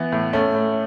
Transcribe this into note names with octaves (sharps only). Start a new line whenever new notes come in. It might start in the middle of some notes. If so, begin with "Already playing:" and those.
Already playing: E3 B3
A2
A2 A3 C#4
A2